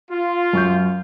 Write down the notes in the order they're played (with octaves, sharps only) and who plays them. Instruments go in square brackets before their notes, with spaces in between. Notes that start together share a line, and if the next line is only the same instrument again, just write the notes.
[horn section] F4
[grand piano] F#2 C#6 G6